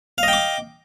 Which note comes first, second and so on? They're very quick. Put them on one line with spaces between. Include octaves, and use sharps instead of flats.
F5 D#5 G5 D6